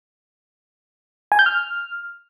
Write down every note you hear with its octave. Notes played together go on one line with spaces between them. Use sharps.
G#5
G6
F6